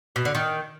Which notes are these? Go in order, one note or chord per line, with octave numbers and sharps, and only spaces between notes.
B2
D3
D#3